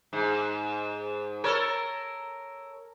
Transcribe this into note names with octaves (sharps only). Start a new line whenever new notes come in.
G#2
A4 A#4 C#5